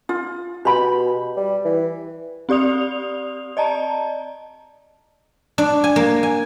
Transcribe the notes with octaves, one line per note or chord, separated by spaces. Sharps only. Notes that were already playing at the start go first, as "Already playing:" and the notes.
F4
B2 G4 B5
G3
E3
C4 G4 D5 D#6 F7
D5 D#5 A5 A#5
D4
G#5
A#3
G#5